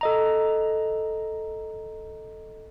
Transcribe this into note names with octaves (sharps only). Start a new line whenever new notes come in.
A4 D#5 A#5